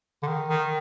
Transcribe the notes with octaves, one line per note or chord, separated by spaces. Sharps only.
D3
D#3
D#3